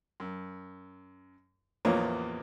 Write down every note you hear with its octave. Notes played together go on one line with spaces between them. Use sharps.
F#2
A1 E2 F3 A#3 B3 C#5